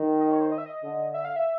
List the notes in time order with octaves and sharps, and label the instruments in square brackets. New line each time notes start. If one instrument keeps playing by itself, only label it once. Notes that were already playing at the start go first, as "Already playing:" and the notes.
Already playing: [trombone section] D#3
[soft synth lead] D#5
C#5
C5
D#5
E5
D#5
[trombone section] D3
[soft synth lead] E5
F5
E5